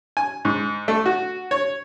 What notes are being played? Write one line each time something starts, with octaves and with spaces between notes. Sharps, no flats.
G#5
G#2
A3
F#4
C#5